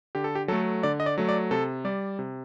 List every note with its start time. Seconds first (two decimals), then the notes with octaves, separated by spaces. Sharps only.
0.15 D3 G4
0.24 A4
0.35 G4
0.48 F#3 A3 A4
0.83 D3 D5
1.00 D#5
1.06 D5
1.18 F#3 A3
1.29 D5
1.51 C3 A4
1.85 G3 D5
2.19 C3